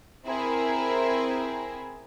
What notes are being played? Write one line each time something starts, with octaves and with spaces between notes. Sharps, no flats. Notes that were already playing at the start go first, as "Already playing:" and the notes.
C4 E4 G#4 A#4